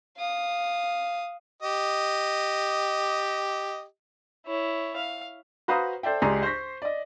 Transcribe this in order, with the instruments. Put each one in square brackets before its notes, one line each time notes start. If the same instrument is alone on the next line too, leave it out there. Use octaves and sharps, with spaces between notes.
[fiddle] F5 D#6
[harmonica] G4 D#5
[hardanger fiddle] E4 C#5
F5
[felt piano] F#4 B4 C5 F5 A#5 D#6
A4 C5 D5 E5 G5
C#2 G4 G#4 D5 A#5 C6
C5 C6 C#6 A#6 B6
D5 D#5